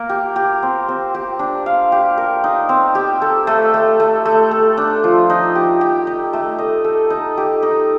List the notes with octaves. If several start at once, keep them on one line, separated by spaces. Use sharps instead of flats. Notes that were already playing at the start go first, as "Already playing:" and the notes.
Already playing: A#3 A#4
G4
G4
C4
C4
G4
D4
F5
G4
A#4
D#4
C4
G4
A4
A3
A3
A3
A3
A4
D4
F3
D#4
G4
G4
D#4
A3
D#5
A4
D#4
G4
D#4